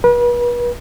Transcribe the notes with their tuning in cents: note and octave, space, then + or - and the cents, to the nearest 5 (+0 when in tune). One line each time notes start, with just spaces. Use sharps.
B4 -35